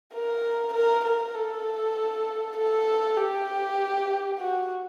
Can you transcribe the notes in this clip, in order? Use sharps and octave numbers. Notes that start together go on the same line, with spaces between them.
A#4
A#4
A#4
A4
A4
G4
F#4